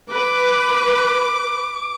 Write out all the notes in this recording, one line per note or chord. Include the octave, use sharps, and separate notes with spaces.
B4 D6